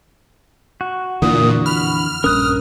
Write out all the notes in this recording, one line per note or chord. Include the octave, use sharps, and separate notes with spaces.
F#4
F2 A#2 D3 E3 D#6
B5 F6
A#1 G2 C#4 A#4 D#6 F#6